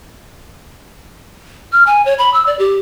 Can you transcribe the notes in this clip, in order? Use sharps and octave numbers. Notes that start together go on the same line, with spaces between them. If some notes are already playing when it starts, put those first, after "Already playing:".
F6
G#5
C#5
B5
E6
D5
G4